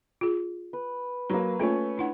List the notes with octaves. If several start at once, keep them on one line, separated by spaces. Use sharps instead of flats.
F4 G#4
B4
F#3 A#3 B4 A#5 E6
A3 A#3 C#4 F4
D4 E4 F#5